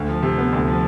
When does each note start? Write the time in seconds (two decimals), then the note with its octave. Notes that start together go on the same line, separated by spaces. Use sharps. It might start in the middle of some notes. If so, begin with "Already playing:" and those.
Already playing: D2
0.09 F3
0.23 C3
0.38 B3
0.53 D2
0.67 F3